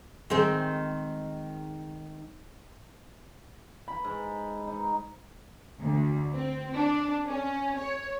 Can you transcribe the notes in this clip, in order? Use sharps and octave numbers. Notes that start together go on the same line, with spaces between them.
D#3 G#3 C4
B5
G#2
D#4
D2
C4
D4
C#4
C#5